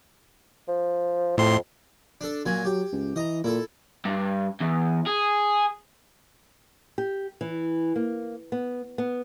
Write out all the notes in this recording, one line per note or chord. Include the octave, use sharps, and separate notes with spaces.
F3
F2 A2 C6
D4 A4
A#2 F#3 G#5
F#3 G4
C#2
E3 D#5 A#5
A#2 E4 A4
G2
E2
G#4
G4
E3
A#3
B3
B3